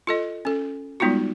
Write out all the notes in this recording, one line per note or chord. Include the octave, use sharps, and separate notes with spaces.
F4 A4 D#5
C#4 A4
G3 G#3 B3 D#4 F4 F#4